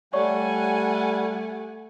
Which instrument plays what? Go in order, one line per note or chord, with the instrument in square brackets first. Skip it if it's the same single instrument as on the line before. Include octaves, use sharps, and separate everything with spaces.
[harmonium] G3 [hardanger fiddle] A3 [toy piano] C#5 D5 C#6 [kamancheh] F#5 G#5